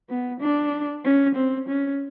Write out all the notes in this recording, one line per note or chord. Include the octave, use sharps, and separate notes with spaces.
B3
D4
C#4
C4
C#4